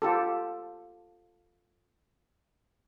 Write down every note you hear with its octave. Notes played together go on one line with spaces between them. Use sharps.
F4 G4 A4